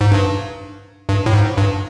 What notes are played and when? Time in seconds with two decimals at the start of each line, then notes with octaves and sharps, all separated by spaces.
0.01 G#2
0.12 G2
1.09 G2
1.26 A2
1.33 G#2
1.57 G2